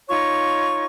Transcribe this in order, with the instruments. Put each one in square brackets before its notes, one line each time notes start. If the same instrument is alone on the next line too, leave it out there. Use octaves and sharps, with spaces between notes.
[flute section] D#4 F4 C#5 C#6